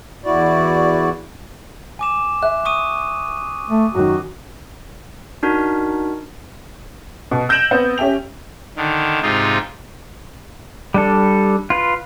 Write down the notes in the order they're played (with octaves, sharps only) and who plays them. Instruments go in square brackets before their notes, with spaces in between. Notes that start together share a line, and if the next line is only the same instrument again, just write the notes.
[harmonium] E2 E4 F#4 D5
[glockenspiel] G#5 D6 E7
[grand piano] E5 [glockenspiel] F#6
[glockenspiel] C#6 D#6 D#7
[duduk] A3
[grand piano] F#2 D#3 [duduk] F#4
[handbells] D4 D#4 F#4 A#4
[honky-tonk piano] B2
E6 G6 A#6 D7 E7 F#7
B3 C4
C#4 G4 E5 G5 F7
[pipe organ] D3 D#3
G#2 C3 D#4 F4
[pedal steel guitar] G3 D4 A4
F4 B4